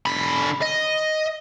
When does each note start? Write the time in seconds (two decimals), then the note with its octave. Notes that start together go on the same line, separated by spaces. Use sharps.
0.06 D3 B5
0.62 D#5